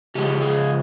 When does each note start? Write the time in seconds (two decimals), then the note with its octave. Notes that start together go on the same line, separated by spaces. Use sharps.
0.15 C#3 F3 G#3 G4
0.42 G#4